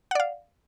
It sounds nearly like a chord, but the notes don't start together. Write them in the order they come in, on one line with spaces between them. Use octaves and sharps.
F#5 D5 F5